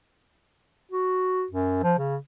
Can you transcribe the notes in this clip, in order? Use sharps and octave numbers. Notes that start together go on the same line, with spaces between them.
F#4
F#2
F3
C#3